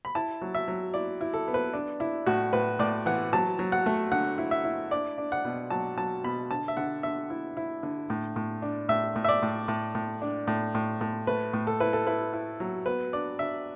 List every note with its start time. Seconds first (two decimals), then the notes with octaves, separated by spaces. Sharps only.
0.05 B5
0.15 E4 A5
0.42 F#3
0.55 E5
0.68 F#3
0.94 E4 D5
1.21 E4
1.34 A4
1.48 B3
1.54 B4
1.73 D4
2.00 D4 E4
2.26 A2 F#4
2.53 A2 B4
2.79 A2 D5
3.06 E3 F#5
3.33 F#3 A5
3.59 F#3
3.72 F#5
3.86 A3
4.12 D3 F#5
4.38 E4
4.51 E5
4.65 E4
4.91 D4 D5
5.18 D4
5.32 F#5
5.45 B2
5.70 F#3 A5
5.97 F#3 A5
6.24 B2 B5
6.51 D3 A5
6.68 E5
6.77 D3 F#5
7.03 D3 E5
7.30 E4
7.57 E4
7.83 D3
8.10 A2
8.36 A2
8.62 D4
8.89 A2 E5
9.16 A2
9.24 E5
9.29 D5
9.42 A2
9.68 A2
9.95 A2
10.22 D4
10.47 A2
10.75 A2
11.01 A2
11.27 A3 B4
11.53 A2
11.67 A4
11.80 E4 B4
11.93 A4
12.07 E4 B4
12.33 E4
12.60 F#3
12.86 B3 B4
13.13 D4 D5
13.39 D4 E5